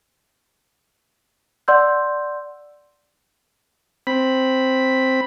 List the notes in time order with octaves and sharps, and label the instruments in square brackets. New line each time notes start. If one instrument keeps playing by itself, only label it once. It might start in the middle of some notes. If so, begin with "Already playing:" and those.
[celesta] D5 F#5 C6 E6 G6
[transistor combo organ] C4 B5